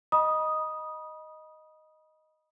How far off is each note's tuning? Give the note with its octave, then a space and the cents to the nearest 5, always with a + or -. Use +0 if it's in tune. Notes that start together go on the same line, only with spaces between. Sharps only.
D#5 +0 B5 -35 D#6 +0